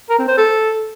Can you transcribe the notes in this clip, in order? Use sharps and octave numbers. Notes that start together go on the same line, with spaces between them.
A#4
C4
C5
A4